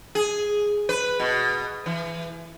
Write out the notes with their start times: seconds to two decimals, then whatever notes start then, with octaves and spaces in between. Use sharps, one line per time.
0.15 G#4
0.89 B4
1.20 B2
1.86 E3